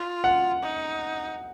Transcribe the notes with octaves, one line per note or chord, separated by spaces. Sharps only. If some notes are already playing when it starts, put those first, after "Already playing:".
Already playing: F4
F#5
D#4